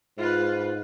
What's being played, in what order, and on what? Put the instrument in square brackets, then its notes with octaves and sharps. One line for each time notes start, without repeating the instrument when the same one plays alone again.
[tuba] G#2 [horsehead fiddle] F4 B4